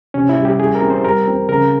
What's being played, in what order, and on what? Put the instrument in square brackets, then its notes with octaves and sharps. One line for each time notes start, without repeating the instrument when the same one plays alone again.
[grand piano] C3 [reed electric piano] C#4
[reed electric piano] E4
[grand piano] G3
[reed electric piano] G4
[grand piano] G3 [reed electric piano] G#4
[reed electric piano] A#4
[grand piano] C4
[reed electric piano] C5
[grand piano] G3 [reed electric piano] A#4
[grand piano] C4
[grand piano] C#3 [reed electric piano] A#4